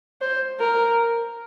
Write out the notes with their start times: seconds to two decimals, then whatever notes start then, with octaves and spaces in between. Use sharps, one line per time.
0.21 C5
0.60 A#4